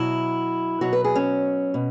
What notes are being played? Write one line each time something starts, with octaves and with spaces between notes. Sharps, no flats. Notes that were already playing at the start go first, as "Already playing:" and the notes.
Already playing: B2 F#3 E4
B2 F#3 F#4
B4
G#4
C#4
B2